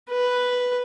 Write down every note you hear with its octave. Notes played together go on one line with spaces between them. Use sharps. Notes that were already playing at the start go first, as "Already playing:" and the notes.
B4